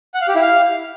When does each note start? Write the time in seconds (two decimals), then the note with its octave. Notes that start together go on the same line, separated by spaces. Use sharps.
0.14 F#5
0.21 F5
0.28 G4
0.35 E4
0.42 F5